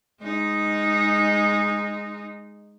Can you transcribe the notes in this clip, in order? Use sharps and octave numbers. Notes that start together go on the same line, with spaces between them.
G#3 D#4